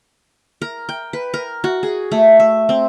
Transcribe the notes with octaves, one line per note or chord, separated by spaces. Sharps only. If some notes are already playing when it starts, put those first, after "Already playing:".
A#4
G5
B4
A#4
F#4
G#4
A3
E5
C4